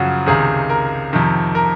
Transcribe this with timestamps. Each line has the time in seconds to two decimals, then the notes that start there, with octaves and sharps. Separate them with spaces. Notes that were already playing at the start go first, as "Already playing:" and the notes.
Already playing: F#2 C#3 F3 F#4
0.26 C#2 C3 D#3 G#4
0.69 A#4
1.13 F2 C3 D#3
1.55 A#4